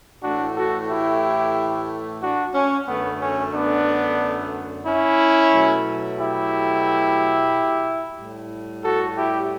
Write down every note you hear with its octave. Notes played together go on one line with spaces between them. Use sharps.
A2 E3 A3 D4 F#4
F#4 A4
E4 G4
D4 F#4
C#4
F#2 D3 A3 B3
C#4
B3 D4
C#4 E4
B2 F#3 A3
E4 G4
A2 G3
F#4 A4
E4 G4